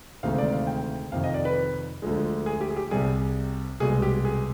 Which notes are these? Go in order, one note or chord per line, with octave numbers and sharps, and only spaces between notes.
D2 C3 D#3 G#3 F5
D5
F5
G5
F2 C3 D#3 F5
D#5
D5
B4
D2 D3 F3 G#3
G#4
G4
G#4
G4
C2 C3 G3 G#4
C2 B2 G#3 G#4
G4
G#4